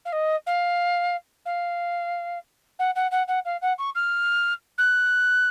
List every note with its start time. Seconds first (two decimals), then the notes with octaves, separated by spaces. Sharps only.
0.05 F5
0.12 D#5
0.46 F5
1.45 F5
2.79 F#5
2.96 F#5
3.11 F#5
3.28 F#5
3.45 F5
3.62 F#5
3.78 C#6
3.95 F6
4.78 F#6